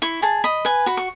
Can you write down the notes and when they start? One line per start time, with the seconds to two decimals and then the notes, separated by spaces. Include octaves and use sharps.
0.02 E4 C#6
0.22 G#4 A5
0.44 D#5 B5
0.65 B4 G#5
0.86 F#4 B5
0.97 C#6